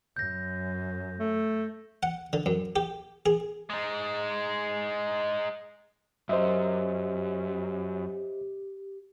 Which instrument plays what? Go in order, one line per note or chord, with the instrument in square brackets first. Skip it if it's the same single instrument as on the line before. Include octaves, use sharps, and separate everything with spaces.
[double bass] F#2 [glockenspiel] G6 A#6
[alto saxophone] A3
[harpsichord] F#5
D3
F#2
G4
G#4
[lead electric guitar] G#3 D#4
[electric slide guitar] F#2 [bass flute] G4 [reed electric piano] C5 D#5 E5